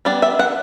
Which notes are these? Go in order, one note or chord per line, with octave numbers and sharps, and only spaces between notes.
G3 B3 D4 D5
E5
F#5